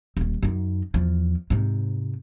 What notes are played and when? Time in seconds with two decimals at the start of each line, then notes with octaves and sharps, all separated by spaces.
0.17 D#1 D#3
0.43 F#2 D#4
0.94 E2 F3
1.50 G#2 C3